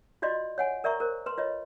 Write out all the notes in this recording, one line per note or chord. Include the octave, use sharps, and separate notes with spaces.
F4 F#4 D5 D#5 C6
C#5 F#5 G#5
A#4 D5 E5 A#5 C#6
A#4 C5
B4 C6
F4 C#5 D#5